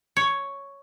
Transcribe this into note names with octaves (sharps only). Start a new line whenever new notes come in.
C#5